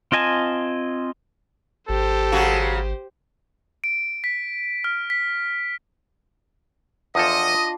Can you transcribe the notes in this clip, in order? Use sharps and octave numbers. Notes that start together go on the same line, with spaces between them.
C4 F4 D#5 G#5 A5
G#1 G4 A4 C5
C#3 F#3 F#4
D7
B6
F6
B6
E2 F3 D4 F4 A4 D#5 D#6